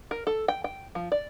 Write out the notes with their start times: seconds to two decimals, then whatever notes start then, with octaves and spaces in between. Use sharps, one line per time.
0.11 A#4
0.27 A4
0.48 G5
0.64 G5
0.95 F3
1.12 D5